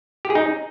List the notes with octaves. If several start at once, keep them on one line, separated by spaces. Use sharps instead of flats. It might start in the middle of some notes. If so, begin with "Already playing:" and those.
G4
G#4
D#4